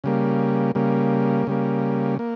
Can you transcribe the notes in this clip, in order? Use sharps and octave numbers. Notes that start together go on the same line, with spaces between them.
C#3 G3 A#3
C#3 G3 A#3
C#3 G3 A#3
A#3